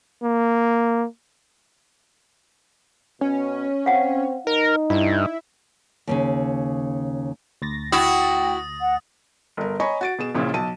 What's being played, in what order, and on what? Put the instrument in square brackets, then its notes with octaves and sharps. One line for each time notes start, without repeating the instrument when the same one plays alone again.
[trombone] A#3
[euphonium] B2 [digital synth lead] C#4
[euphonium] C4 [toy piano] F5 F#5
[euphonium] D#4 [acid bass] A#4
[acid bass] G2 [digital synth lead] E4
[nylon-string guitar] D#2 A2 C#3
[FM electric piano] D2 A6 A#6
[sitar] E4 F#4 [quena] G5 [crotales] D#6
[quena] F#5
[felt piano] G1 A#4
C#5 D#5 G#5 A#5 B5 C#6
F#4 A6 D7
B2 G#4 E7
A#1 A#2 C#3 E4
B1 A5 D#7